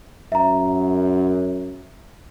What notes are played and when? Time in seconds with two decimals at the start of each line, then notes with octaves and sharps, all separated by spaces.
0.32 F#2 E5 A#5